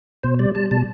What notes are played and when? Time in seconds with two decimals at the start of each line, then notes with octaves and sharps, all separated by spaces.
0.23 B2 C5
0.39 G3 D5
0.55 G3 A5
0.71 B2 A5